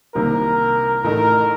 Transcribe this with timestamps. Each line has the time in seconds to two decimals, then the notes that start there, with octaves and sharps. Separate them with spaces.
0.15 C2 C3 D#3 A#3 A#4
1.04 A1 A2 A3 D#4 A#4